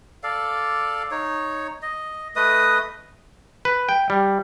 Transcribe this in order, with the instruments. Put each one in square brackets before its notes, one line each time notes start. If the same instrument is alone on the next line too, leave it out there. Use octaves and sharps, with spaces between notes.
[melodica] A4 D5 F5
D#4 C#5
D#5
A3 B4 D#5 D#6
[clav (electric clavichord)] B4
G5
G3